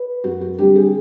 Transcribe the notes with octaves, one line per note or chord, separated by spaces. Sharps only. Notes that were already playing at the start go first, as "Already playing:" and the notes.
Already playing: B4
F#2 F#4
F#4
D3 G3 C4 G4
G#4